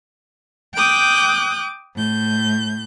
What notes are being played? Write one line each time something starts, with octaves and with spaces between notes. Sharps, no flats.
G5 D6 D#6 F#6 G6
A2 G6